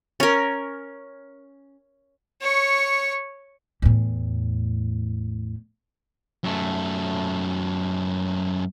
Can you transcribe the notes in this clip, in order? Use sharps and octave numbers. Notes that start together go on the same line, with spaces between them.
C#4 A#4
C#5 C#6
E2 A2
F#2 A3